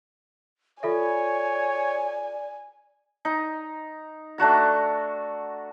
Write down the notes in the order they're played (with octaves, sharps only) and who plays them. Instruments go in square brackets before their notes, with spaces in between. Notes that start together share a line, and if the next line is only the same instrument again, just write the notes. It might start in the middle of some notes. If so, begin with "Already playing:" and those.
[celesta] F4 A4 E5 [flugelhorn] C#5 [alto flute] D5 [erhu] G#5
[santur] D#4
A3 D4 F#4 A#5